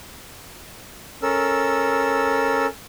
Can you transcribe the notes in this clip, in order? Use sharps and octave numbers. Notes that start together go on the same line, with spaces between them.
C#4 A4 A#4 E6